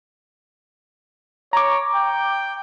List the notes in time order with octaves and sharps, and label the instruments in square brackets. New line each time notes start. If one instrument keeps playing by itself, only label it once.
[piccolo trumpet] C#5 [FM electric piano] A#5 D6
[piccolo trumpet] G5